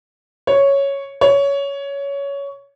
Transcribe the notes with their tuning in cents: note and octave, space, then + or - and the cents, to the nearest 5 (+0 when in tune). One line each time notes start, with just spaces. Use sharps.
C#5 +0
C#5 +15